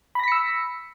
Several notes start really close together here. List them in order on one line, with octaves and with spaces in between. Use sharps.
B5 A#6 B6 C#7 E6